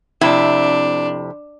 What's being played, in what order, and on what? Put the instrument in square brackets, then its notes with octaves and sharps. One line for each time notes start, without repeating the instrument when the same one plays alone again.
[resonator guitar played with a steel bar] F2 C3 E4 [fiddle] D4